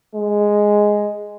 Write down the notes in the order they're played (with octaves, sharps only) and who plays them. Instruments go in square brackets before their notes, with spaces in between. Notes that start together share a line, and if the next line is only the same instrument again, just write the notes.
[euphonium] G#3